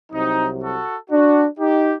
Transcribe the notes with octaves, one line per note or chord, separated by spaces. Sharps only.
C2 C3 F#3 C4 D#4
F#4 A4
D4 F#4
D#4 G4